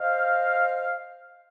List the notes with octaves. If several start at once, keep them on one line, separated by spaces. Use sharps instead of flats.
C5 D#5 F5